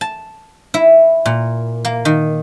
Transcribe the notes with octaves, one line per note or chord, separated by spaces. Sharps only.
A5
E4
A#2
A#3
D#3